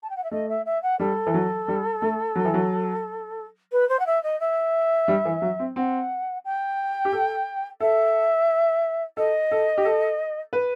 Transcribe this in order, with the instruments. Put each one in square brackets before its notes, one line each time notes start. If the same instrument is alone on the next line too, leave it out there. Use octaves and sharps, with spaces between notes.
[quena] A5
G5
F#5
E5
[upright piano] A3 [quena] D#5
[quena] E5
E5
F#5
[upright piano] G3 [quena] A4
[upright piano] E3
F#3
G3
A3
F#3
E3
F#3
[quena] B4
C5
F#5
E5
D#5
E5
[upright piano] G3
E3
F#3
C4
[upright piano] C4 [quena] F#5
[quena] G5
[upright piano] G4
A4
[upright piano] A4 [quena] E5
[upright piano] A4 [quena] D#5
[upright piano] A4
G4
A4
B4